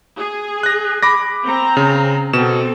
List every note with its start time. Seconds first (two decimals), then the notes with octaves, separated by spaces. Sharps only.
0.19 G#4
0.63 F#6 A#6
1.03 B5 D6 A#6
1.45 C4 A#5
1.77 C#3
2.33 B2 C4 A4 E7